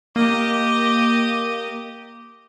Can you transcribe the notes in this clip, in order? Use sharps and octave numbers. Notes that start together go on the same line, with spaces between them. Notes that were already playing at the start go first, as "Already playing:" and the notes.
A#3 G4 D#5